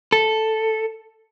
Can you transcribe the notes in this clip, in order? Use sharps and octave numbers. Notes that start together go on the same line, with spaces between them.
A4